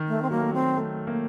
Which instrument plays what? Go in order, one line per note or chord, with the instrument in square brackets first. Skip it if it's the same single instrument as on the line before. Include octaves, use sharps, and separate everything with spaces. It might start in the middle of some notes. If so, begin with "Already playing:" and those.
Already playing: [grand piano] D#3
[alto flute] A3
C4
[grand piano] F#3 [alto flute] A#3
[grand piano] A3
F#3
[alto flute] C4
[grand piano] A3
A#3